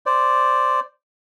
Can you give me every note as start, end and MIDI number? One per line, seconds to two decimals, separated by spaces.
0.06 0.80 72
0.06 0.80 74